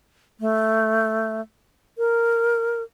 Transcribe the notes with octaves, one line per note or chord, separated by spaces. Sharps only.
A3
A#4